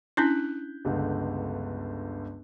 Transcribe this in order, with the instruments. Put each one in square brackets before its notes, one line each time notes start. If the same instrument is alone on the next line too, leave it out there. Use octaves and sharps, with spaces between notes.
[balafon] C#4 D4 E4 [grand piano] F#6 G6 B6
[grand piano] G1 C#2 D3